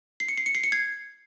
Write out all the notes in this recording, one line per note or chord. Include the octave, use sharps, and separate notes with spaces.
C7
C#7
C7
C#7
C7
C#7
G#6 C7